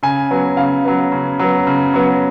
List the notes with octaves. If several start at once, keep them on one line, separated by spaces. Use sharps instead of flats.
C#3 G#5
F#3 B3
C#3 F5
F#3 B3
C#3
F#3 B3
C#3
F#3 B3